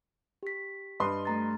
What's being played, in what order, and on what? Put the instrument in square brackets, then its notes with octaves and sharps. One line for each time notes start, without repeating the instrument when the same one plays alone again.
[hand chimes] G4 B6
[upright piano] G2 B4 C6 [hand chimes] D#5 D#6
[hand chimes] A3 A#5 A6